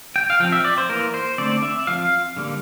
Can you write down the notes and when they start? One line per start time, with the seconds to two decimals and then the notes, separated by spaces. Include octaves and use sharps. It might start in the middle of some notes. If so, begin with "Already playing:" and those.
0.16 G5
0.30 F5
0.40 F3 C4 G5
0.52 E5
0.65 D5
0.78 C5
0.89 E3 A#3 A#4
1.14 C5
1.38 D3 A3 C4 D5
1.63 E5
1.87 F3 C4 F5
2.37 D3 G3 A#3